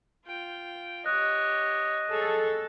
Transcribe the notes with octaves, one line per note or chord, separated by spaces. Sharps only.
F4 G5
G4 C#5 D#5 F#6
G#4 A4 C#5